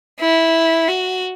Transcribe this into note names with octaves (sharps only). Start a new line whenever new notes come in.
E4
F#4